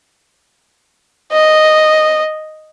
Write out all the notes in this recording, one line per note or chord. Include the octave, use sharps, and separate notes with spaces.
D#5